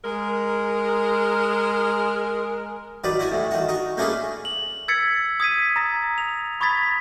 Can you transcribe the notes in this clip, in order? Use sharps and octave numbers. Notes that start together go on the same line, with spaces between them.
G#3 A#4
D#3 F#3 B4 D5
E4 F#4 G#5
D2 A2
D#3 F#4
D#4 F#4
A3 A#3 C#4 D4 G#4 B4
F#7
E6 G#6 A6 B6 C#7
D#6 G#6 B6 D#7
A#5 D#6 A6 A#6
F7
B5 C#6 D#6 G#6 A6 B6